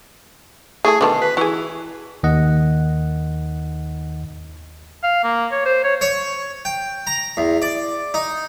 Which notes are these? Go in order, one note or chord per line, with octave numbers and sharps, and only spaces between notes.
A3 E4 G#4 A4
B2 D3 D#3 A5
B4
E3 F#4 G#4
D#2 D#3 D#5 F#5
F5
A#3
C#5
C5
C#5
C#5
G5
A#5
E2
D5
D#4